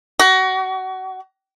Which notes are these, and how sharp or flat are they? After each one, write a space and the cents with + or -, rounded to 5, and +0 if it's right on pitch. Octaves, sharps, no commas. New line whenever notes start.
F#4 +25